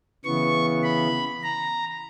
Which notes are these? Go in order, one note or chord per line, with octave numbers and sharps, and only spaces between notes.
C#3 E3 B3 C#6
B5
A#5